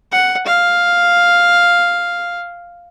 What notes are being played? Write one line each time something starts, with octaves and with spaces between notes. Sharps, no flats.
F#5
F5